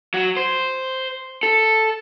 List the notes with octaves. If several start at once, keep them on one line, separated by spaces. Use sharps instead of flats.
F#3
C5
A4